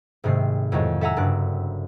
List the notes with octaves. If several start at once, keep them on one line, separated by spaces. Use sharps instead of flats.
G#1 G#2 C3 A3 C7
F2 A2 D#3 F#3 G#3
A4 E5 F#5 G#5 A#5 E6
F#1 G2 D5 F#6